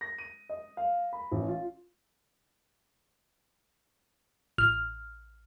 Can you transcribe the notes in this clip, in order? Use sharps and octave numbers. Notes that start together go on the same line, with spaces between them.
A#6
D#7
D#5
F5
B5
A1
F4
A1 F6